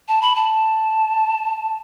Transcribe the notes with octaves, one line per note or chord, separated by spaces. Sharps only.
A5
B5
A5